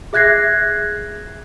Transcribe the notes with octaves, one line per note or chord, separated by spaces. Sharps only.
G#4 E5 F#6 G#6 A#6 C7